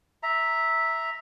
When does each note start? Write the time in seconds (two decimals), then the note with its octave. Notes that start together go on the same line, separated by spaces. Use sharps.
0.23 E5 A#5